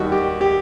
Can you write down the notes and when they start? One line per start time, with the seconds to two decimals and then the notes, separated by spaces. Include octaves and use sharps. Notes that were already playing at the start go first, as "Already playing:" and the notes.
Already playing: D#2 D#3 G3 F#4
0.12 G4
0.41 G4